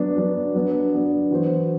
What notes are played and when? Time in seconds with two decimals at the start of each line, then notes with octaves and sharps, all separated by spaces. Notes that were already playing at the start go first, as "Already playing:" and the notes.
Already playing: F#3 B3 D4
0.17 F#3 B3 D4
0.55 F#3 B3 D4
0.92 F#3 B3 D4
1.30 E3 B3 F#4 C5